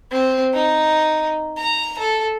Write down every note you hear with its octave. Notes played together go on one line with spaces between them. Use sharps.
C4
D#4
A#5
A4